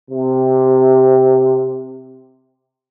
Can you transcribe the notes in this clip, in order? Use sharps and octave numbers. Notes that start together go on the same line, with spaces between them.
C3